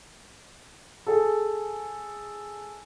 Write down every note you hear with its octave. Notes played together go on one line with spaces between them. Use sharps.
G#4 A4